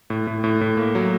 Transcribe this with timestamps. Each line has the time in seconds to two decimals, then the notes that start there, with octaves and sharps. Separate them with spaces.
0.10 A2
0.27 A2
0.44 A2
0.61 A2
0.77 A#3
0.95 F#3